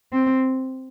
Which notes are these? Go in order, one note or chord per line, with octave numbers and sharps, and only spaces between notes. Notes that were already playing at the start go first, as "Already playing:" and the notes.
C4